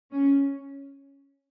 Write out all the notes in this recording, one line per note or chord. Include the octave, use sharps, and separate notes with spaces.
C#4